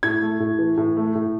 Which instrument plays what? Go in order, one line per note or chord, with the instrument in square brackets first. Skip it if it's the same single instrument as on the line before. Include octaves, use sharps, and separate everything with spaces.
[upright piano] A2 G#6
A3
A2
E3
A2
A3
A2